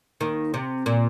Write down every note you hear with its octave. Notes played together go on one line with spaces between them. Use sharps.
D#2 D#3
C3
A#2